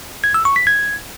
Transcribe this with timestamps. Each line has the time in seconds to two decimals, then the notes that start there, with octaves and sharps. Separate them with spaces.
0.24 G#6
0.34 E6
0.45 C#6
0.56 B6
0.67 G#6